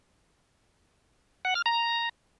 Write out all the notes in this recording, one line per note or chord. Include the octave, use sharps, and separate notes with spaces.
F#5
F6
A#5